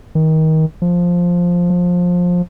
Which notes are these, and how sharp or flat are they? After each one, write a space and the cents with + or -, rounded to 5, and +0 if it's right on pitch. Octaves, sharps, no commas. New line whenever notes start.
D#3 +25
F3 +5
F3 +20